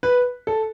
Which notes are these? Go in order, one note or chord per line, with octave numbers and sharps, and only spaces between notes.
B4
A4